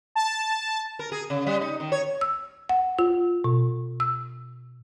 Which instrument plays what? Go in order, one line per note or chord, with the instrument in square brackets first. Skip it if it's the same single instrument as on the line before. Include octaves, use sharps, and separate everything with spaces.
[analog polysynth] A5
[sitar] A#4
G#4
C#3
G3
D#4
D#3
C#5
[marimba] E6
F#5
F4
B2
E6